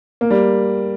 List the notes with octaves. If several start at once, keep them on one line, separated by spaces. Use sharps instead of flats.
A#3
G3